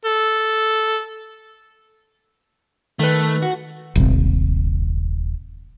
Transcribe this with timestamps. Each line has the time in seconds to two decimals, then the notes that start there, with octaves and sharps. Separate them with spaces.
0.05 A4
2.99 D#3 A3 B4
3.42 F#4
3.95 D#1 G#1 C3